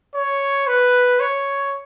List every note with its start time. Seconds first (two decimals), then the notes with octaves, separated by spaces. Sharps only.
0.15 C#5
0.67 B4
1.20 C#5